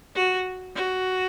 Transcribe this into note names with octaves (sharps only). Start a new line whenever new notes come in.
F#4
F#4